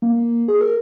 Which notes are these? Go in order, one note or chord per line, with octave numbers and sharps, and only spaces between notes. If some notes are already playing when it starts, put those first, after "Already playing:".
A#3
G#4
A#4